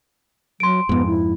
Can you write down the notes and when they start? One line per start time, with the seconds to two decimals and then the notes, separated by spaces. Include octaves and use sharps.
0.60 F#3 C6 D7
0.89 F2 G#2 B3
1.07 E4